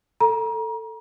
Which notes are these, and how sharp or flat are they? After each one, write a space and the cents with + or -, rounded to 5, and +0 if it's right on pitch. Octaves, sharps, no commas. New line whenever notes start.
A4 +15 A#5 +30